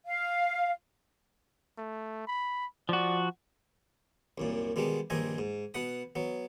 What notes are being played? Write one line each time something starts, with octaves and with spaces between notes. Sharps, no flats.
F5
A3
B5
F3 F#4 D5
C2 F#2 A#2
B2 D#3 G3 G#3 B3
A#1 G2 D#3 C4 D#5 G#5
G#2
B2 B4 F#5 B5 D#6
F#3 B3